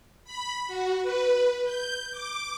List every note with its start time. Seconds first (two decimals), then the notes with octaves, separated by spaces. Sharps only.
0.24 B5
0.67 F#4
1.02 B4
1.64 G6
2.12 D6